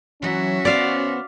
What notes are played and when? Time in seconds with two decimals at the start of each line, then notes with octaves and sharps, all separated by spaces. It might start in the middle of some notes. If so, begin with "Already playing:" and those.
0.22 E3 F#3 C#4 F#4 E5
0.65 B3 C5 D5 F5